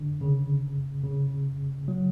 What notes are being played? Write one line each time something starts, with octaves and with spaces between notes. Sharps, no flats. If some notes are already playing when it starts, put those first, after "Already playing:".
Already playing: D3
C#3
C#3
F#3